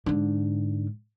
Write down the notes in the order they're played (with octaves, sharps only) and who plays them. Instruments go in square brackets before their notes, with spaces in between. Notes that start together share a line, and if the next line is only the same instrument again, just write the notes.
[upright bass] G#2 D3